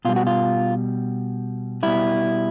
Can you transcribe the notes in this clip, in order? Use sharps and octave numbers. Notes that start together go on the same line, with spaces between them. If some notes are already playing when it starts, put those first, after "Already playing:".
B2 G3 F4
F#4
F4
B2 G3 E4